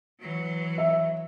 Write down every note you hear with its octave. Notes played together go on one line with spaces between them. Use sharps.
E3 F#3
E5